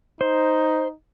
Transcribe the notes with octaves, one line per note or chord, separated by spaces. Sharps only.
D#4 C5